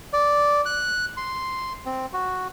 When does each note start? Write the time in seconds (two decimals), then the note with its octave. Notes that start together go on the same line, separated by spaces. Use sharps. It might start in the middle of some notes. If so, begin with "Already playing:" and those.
0.13 D5
0.66 F#6
1.17 C6
1.86 C4
2.13 F#4